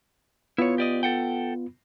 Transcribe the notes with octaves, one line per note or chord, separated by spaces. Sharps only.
B3 E4 F4 C#5
G4 D5 D#5
A4 F#5 G5